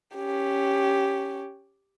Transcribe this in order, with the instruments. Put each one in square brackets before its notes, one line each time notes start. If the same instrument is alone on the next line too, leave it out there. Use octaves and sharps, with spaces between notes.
[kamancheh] C#4 G4